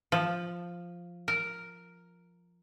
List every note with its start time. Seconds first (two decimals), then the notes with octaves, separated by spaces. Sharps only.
0.12 F3
1.28 A#4